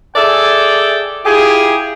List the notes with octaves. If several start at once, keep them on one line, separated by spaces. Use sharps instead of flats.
G#4 A4 D5 E5 G5
E4 F4 G4 G#4